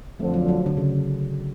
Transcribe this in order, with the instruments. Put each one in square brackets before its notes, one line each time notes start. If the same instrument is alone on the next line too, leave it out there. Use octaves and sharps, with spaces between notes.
[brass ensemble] F2 D3 F3 [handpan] A3
[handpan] F#3
F#3
D3
C#3